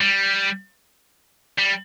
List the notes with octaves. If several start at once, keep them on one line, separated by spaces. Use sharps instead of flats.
G3
G3